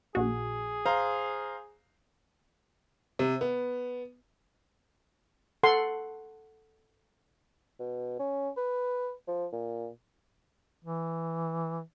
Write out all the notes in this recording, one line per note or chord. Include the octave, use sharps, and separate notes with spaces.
A#1 F#4 G#4
C5 F5 A#5
C3
B3
A4 F#5 C6
B2
C#4
B4
F3
A#2
E3